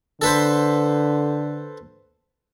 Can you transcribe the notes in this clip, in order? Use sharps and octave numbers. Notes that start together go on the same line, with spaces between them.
D3 A4 B4 C5